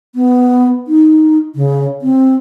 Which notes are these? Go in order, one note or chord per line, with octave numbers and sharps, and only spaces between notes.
B3
D#4
C#3
C4